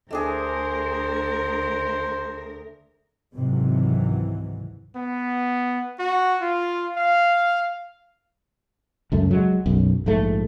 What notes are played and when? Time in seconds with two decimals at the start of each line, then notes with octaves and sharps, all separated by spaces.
0.11 D2 A3 D4 G#4 A#4 C5
3.37 G#1 C#2 G#2 C3 E3 F#3
4.96 B3
5.99 F#4
6.41 F4
6.97 F5
9.12 C#2 F#2 A3
9.31 F#3 G#3
9.66 B1 F#2
10.06 A#1 G#2 A3